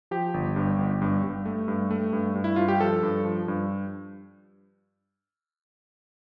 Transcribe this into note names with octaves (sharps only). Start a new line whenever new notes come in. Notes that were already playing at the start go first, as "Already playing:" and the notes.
F3 G4
G1
G2
G1
G2
G2
A3
G2
A3
G2
G2
E4
G2 F4
G4
F3 A4
G2
F3
G2